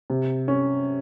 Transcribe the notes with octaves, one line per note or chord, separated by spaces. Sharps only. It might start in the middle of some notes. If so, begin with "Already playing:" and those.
C3
C#4